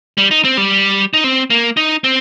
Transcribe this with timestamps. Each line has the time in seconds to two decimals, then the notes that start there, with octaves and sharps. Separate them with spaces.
0.18 G3
0.31 D#4
0.45 C4
0.57 G3
1.14 D#4
1.24 C4
1.50 A#3
1.77 D#4
2.04 C4